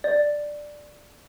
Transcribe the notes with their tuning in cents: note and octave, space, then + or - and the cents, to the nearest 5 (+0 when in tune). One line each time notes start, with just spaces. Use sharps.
D5 +5